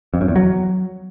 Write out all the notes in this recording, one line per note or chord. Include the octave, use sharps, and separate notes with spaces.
F2
F#2
E2
F#3